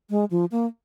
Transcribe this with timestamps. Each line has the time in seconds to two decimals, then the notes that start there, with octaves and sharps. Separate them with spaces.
0.10 G#3
0.31 F3
0.51 A#3